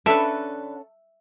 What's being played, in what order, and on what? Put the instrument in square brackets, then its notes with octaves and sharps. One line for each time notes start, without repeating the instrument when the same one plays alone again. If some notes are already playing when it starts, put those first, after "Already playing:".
[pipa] D3 B4 [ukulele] C#4 A4 [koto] E5